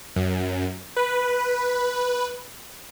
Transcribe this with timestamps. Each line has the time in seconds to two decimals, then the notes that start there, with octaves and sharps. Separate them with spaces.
0.16 F#2
0.96 B4